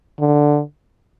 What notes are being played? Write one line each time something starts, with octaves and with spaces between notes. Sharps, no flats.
D3